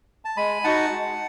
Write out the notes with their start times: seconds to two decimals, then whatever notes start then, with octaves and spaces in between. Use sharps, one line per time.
0.25 A5
0.37 G#3 G#5 B5
0.64 D#4 F#4 F#5 A5
0.92 G#3